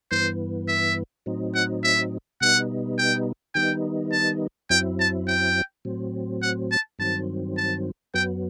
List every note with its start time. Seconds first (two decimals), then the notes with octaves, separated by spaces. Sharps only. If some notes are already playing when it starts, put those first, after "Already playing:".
0.11 G2 E3 B3 C5
0.68 E5
1.26 A2 F#3 C4 D#4
1.55 F#5
1.84 E5
2.41 B2 G3 B3 D#4 F#5
2.98 G5
3.55 D#3 G3 B3 D#4 G5
4.12 A5
4.70 F#2 F#3 C4 E4 G5
4.99 A5
5.27 G5
5.85 A2 F#3 C4
6.42 F#5
6.71 A5
6.99 G2 D#3 F#3 C4 A5
7.57 A5
8.14 F#2 F#3 B3 G5